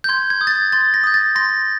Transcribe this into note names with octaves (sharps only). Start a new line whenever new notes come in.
G6
C6 G#6
G#6
D#6 G6
A6
G#6
C6 A6
A#6
D#6 G6
A6
C6 A#6